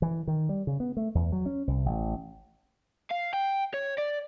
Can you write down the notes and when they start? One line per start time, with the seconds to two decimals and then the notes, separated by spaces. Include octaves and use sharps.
0.02 E3
0.27 D#3
0.49 G3
0.67 C#3
0.80 B3
0.97 A3
1.15 E2
1.32 F#3
1.46 C#4
1.67 C2
1.86 A1
3.11 F5
3.33 G5
3.74 C#5
3.98 D5